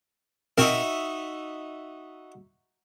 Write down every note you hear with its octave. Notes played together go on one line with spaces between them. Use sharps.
B2 C4 D#4 F#4 A#4 E5